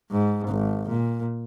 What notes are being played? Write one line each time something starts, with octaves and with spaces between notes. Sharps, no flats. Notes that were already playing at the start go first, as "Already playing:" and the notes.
G#2
G#1
A#2